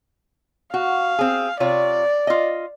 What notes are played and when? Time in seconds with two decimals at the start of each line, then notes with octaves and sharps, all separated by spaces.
0.74 F#4 F5
1.19 C4 G#4
1.60 C3 F4 C#5 D5
2.27 F4 D#5